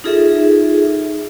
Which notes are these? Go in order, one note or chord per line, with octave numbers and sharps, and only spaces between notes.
D#4 F4 G#4 A4 E5